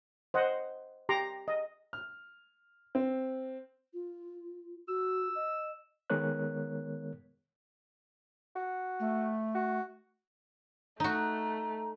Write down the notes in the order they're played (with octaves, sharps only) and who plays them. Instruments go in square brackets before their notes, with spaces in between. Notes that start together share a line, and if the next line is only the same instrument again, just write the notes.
[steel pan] C5 D#5 F#5
G4 A#5 C6 D6
D#5
[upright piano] F6
C4
[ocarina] F4
[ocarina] F#4 [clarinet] E6
[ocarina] D#5
[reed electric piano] D#3 G#3 B3 A#4 C#5 F#6
[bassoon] F#4
[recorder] A3
[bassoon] F#4
[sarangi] A3 [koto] D#4 F#4 [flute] A#5